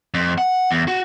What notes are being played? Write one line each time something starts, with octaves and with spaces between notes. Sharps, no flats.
F2
F#5
E2
F#4